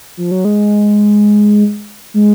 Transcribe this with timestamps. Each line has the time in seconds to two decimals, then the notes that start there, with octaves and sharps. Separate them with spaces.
0.17 F3
0.31 F#3
0.45 G#3
2.14 G#3